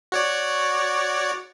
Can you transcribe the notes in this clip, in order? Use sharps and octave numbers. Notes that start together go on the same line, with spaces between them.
F#4 C#5 D5